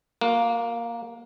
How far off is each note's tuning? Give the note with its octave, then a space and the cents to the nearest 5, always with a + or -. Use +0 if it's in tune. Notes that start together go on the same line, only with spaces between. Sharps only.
A#3 +0 F#4 -40